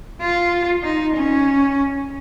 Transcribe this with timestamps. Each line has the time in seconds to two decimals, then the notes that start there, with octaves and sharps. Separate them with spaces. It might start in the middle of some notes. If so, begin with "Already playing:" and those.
0.22 F4
0.84 D#4
1.15 C#4